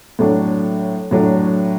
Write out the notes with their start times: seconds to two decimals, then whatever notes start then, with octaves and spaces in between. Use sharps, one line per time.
0.19 A2 F#3 A3 D4
1.11 A2 F#3 A3 D4